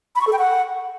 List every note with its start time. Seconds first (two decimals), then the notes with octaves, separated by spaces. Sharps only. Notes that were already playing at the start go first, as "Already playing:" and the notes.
0.16 B5
0.21 C#6
0.27 A4
0.33 G5
0.38 F#5